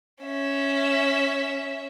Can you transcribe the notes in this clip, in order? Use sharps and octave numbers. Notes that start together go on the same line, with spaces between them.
C#4 E5